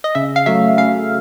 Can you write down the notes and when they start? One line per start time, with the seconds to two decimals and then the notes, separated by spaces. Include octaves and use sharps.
0.04 D#5
0.15 C#3 E5
0.36 F5
0.46 F#3 A3 E5
0.78 C#3 F5